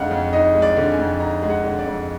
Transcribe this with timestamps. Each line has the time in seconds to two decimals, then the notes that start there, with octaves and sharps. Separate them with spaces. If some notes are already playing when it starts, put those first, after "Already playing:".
Already playing: F2 D3 G#3 D#4 F5 F#5
0.11 F2
0.33 D#4 D#5
0.55 G#3
0.62 D5
0.77 D3
0.91 G#5
0.99 F2
1.20 D#4 A#5
1.42 G#3
1.50 F#5
1.64 D3
1.79 D5
1.86 F2